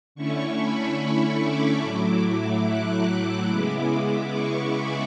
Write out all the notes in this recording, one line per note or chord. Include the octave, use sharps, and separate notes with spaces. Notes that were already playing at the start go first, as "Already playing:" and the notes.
D3 A3 C#4 E4 C#6
B5
C#6
D6
A2 F#3 A3 E4 D6
F#6
C#3 G#3 B3 E4 D6
C#6
B5